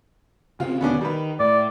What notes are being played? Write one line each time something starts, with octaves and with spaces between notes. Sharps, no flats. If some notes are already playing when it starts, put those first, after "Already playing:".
C#3 C4 F4
D#2 B2 D3 B3 C#4 D4
D#3 G3 B4
A2 D5